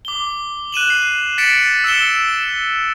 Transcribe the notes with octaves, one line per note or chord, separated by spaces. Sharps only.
D6 G7
F#6 D#7 E7 F#7
C7
A6 B6 C#7 D7 E7 F#7
E6 C#7 E7 G7
E7